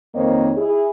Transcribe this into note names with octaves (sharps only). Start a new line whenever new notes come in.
F2 D#3 A#3 C4 C#5 D#5
E4 G#4